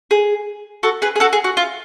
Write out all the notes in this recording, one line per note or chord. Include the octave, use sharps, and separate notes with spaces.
G#4
F#4 A4
G#4 B4
G#4
F#4 A4
G#4
F#4
F4